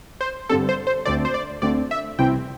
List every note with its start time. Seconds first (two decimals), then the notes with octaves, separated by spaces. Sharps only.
0.21 C5
0.49 G2 D3 G3 C4 A4
0.69 C5
0.87 C5
1.05 D2 D3 A3 C4 D5
1.25 C5
1.34 D5
1.62 D2 D3 A3 C4 D5
1.91 E5
2.18 C2 C3 E3 C4 E4 G5